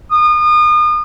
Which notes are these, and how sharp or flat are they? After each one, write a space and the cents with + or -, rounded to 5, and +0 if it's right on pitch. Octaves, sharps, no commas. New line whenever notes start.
D#6 -35